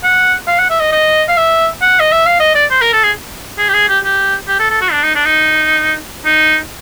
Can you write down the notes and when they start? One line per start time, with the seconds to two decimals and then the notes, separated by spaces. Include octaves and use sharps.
0.04 F#5
0.48 F5
0.59 F#5
0.70 E5
0.80 D#5
0.92 D#5
1.28 F5
1.37 E5
1.82 F#5
2.00 D#5
2.12 E5
2.26 F5
2.40 D#5
2.55 D5
2.71 C5
2.81 A#4
2.93 A4
3.04 G#4
3.58 G#4
3.69 G4
3.74 G#4
3.89 G4
4.04 G4
4.48 G4
4.59 A4
4.70 A4
4.81 F#4
4.92 D4
5.03 D#4
5.15 D4
5.25 D#4
6.25 D#4